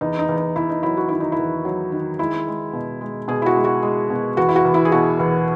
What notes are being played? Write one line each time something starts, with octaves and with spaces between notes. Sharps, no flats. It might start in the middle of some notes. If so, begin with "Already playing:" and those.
E2 D#4
D#4
E2
D#4
E2 E4
D#4
F#3 E4
F#4
D#3 E4
D#4
E4
E2
F#3
D#3
G#3 E4
G#3
B2
G#3
B2 G#4
E4
F#4
G#3
F#4
G#3
B2
E2 F#4
E4
F#4
E2
E4
G#4
B2 F#4
E2